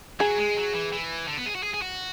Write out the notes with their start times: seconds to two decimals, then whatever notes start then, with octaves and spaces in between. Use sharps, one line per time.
0.20 F#3 G#4
0.38 G#3
0.57 F#3
0.74 E3
0.92 E3
1.28 D3
1.37 B3
1.46 G#4
1.55 F#4
1.63 G#4
1.74 G#4
1.82 F#4